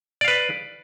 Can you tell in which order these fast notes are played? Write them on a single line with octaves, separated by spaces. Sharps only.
D5 F5 B4